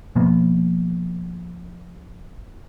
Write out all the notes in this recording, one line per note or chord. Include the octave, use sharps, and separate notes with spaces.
B2 F3 A#3 B3